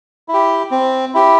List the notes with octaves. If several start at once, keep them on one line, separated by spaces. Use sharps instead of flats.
E4
G4
C4
E4 G4